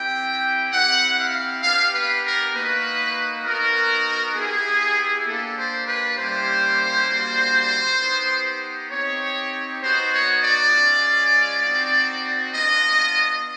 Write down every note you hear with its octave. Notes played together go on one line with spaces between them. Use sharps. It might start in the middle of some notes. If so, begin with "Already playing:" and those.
Already playing: C4 E4 G4 G5
C4 E4 G4 F#5
F5
B3 D4 G4 F5
B4
A#4
A#3 D#4 F#4 B4
B3 D#4 F#4 A#4
B3 E4 G4 G#4
A#3 D4 G4 A4
C5
B4
G3 A#3 C#4 E4 G4 C5
G3 A#3 D4 F#4
B3 D#4 G4
C4 D#4 G4 C#5
B3 D#4 F#4 C5
C#5
D5
G#3 C#4 F4
C4 D#4 F#4
B3 D4 F4 D#5